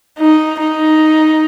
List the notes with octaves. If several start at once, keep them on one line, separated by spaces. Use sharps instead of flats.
D#4
D#4